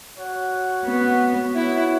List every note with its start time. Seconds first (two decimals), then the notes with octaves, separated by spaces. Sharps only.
0.16 F#4 C#5 F#5
0.85 B3
1.54 B3 E4 F#4 C#5 F#5